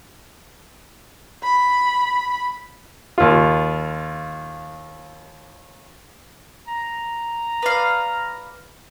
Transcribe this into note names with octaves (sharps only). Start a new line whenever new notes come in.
B5
D#2 F4
A#5
B4 D5 F5